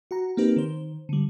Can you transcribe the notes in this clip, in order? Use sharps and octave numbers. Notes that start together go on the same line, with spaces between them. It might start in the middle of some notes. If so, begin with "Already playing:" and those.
F#4 F#5 A#5
A#3 C4 D#4 G4 A#4 B4
D#3 C5
D3 G3